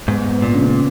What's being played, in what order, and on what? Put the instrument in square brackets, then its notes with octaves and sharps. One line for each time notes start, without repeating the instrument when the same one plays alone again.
[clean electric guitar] G#2 [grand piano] B3
[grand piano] B3
[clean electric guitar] A#2
[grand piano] C#3